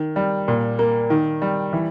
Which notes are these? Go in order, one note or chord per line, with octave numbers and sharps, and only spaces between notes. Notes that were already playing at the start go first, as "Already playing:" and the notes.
Already playing: D#3
G3
A#2
A#3
D#3
G3
E3